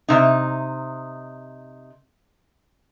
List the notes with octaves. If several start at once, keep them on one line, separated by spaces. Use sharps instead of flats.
C3 D#4